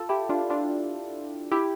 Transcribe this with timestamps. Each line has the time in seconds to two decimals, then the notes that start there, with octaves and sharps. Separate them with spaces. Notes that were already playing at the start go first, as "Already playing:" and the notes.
Already playing: F4 A4
0.09 E4 G4
0.29 D4 F4
0.50 D4 F4
1.51 E4 G4